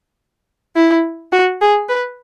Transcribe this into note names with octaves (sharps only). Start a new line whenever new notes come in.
E4
F#4
G#4
B4